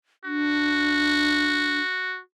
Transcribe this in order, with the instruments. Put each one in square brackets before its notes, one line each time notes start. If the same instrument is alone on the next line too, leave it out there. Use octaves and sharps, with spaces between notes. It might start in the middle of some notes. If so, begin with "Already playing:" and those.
[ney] D4 [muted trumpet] F#4